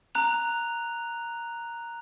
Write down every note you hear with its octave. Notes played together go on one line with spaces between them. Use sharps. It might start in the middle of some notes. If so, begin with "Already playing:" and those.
A#5 F#6 F7